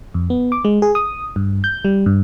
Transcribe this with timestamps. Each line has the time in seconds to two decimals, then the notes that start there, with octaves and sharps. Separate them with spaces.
0.14 F2
0.30 B3
0.52 D6
0.65 G#3
0.82 G#4
0.95 D#6
1.36 G2
1.64 G6
1.85 G3
2.06 G2